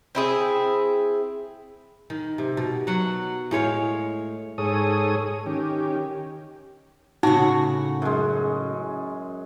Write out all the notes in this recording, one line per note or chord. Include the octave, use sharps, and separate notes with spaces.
C4 E4 G#4
D#3
C3
B2
F#3 F#4 F#5
A2 G#3 C#5 F5
G#2 G#4 A4 C#5 D#6
D#3 C#4 G4
A2 C#3 D#4 F#4
F#2 G#3